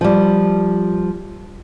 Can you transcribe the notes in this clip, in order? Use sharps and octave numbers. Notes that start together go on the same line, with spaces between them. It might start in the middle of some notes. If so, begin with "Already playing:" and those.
F3 G3